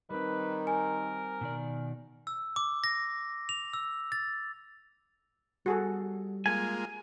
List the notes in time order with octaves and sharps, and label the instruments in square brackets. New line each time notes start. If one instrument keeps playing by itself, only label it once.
[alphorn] D#3 [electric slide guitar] G3 C4 [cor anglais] B4
[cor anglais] A#4 [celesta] G#5
[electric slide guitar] B2 D#3 D5
[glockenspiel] E6
D6
A#6
F7
E6
A6
[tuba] G3 [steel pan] F#4 G#4 A4
[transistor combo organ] G#3 A#3 F4 [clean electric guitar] G#5